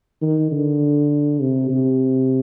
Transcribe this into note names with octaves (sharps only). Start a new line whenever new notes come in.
D#3
D3
C3
C3